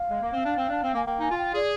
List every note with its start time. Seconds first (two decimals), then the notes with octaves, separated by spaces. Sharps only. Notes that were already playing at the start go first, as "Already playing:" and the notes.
Already playing: F5
0.10 G#3
0.22 A#3
0.33 C4
0.45 D4
0.57 C4
0.69 D4
0.82 C4
0.94 A#3 G#5
1.06 A#3 G5
1.19 D#4 G#5
1.31 F4
1.38 G5
1.54 G#4 D5